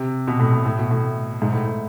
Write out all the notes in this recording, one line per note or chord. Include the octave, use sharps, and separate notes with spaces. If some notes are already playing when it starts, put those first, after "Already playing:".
Already playing: C3
B2
A2
A2
A2
B2
A2
G#2
A2
A2